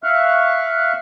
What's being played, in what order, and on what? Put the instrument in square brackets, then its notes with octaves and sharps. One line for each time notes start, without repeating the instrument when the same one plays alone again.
[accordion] E5 F5 C#6 F6 F#6